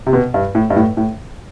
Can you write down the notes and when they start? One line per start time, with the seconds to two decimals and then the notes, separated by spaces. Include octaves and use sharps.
0.07 C3
0.13 B2
0.34 G2
0.55 A2
0.70 G2
0.76 A2
0.97 A2